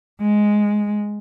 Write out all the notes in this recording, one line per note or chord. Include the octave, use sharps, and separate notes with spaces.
G#3